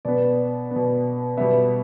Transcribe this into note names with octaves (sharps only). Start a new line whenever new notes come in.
B2 B3 D5
B3
B2
B2 G3 B3 E5